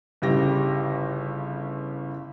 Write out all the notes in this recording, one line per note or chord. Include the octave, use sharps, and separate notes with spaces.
G1 A2 C#3 G4 A#6